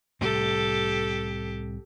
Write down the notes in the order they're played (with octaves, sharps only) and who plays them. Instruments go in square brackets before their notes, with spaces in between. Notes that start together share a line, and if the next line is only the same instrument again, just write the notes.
[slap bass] C2 A2 C3 [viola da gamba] G4 A4